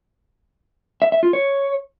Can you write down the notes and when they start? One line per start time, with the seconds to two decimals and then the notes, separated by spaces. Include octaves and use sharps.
1.02 E5
1.12 E5
1.23 F4
1.33 C#5